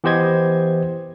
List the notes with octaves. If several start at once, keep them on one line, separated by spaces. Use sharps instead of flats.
E3 B3 G4 C5 D#5 G#6